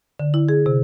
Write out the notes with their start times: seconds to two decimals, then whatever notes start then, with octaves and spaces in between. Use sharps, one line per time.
0.19 D3
0.34 E4
0.49 G#4
0.66 C3